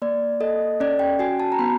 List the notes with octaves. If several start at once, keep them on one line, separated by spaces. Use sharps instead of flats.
A#3 D5
A4 D#5
C#4 D5
G5
F#4 G#5
A5
A#5
B3 B5